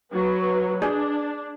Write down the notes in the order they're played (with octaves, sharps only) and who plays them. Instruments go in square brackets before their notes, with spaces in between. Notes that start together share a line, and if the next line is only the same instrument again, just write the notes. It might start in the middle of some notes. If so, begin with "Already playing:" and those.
[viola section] F#3 B4
[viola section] D4 [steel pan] G#4 [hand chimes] D5